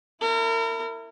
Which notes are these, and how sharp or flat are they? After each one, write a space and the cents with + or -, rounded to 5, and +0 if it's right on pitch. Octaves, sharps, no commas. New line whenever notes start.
E4 +0 A#4 -35